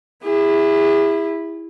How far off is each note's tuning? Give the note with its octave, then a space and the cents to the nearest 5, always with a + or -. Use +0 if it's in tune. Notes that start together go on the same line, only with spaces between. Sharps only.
E4 +0 G#4 -40